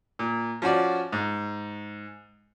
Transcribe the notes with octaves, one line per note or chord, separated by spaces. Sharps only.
A#2
F3 C#4 F#4 D5
G#2